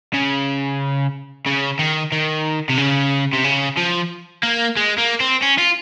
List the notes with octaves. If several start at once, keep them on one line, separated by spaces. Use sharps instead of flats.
C#3
C#3
D#3
D#3
C3
C#3
C3
C#3
F3
A#3
G#3
A#3
C4
C#4
F4